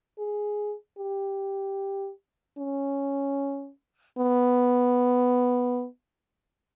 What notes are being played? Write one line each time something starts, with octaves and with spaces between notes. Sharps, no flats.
G#4
G4
C#4
B3